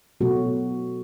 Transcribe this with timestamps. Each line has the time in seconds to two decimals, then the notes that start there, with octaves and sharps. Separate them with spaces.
0.21 B2 F#3 A3 F#4